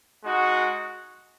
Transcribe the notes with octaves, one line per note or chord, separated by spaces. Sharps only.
G#3 D#4 F#4